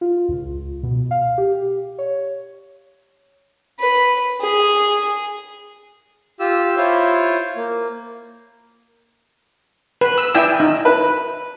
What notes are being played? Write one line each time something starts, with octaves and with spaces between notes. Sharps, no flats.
F4
C#2
B2
F5
G4
C#5
B4
G#4
F4 G4 E6
E4 F4 C5 C#5
A#3
B4
E6
E4 D5 G5 G#5 E6
D#4
B4